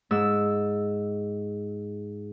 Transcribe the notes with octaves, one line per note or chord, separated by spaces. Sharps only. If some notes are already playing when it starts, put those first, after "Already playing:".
G#2 E6